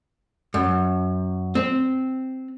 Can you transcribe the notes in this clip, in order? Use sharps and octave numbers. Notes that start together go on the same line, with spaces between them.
F#2
C4